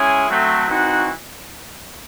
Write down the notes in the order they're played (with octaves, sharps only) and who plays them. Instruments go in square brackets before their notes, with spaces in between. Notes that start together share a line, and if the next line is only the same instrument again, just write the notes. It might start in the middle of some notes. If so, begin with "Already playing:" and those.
Already playing: [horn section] G#3 C#4 E4 G#4
F#3 A3 C4
E3 C4 D#4 F#4